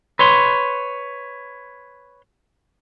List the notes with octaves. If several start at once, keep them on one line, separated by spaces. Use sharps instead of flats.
B4 C#5 C6